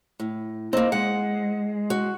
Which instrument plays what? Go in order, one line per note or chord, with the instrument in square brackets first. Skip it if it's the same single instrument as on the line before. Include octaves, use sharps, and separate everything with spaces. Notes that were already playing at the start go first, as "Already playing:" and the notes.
[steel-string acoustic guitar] A2
[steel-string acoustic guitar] A#3 C4 [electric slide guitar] D#4
[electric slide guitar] G#3 [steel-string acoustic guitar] F#5
[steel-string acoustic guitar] F#4